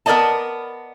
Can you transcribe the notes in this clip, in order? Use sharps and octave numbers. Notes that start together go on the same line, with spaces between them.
B3 A#4 C5 D5 D#5 A5